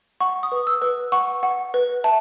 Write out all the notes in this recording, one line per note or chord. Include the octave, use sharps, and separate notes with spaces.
F#5 C#6
D#6
B4
E6
B4
F#5 C#6
F#5
B4
E5 A5